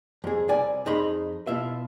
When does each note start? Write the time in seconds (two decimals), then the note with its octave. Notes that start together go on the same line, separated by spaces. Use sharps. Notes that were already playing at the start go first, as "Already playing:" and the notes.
0.24 F2 G#4
0.49 C2 D5 G#5
0.86 F2 D#4 G#4 B5 C6
1.47 B2 E4 F4 E5